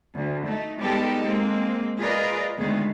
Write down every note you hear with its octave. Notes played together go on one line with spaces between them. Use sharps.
D2
A3 D#4
G3 G#3 B3 D#4 G4 A4
G#3 A#3 C4
F4 G#4 A#4 B4 D5 D#5
D2 D#3 G#3 A3 B3 G#4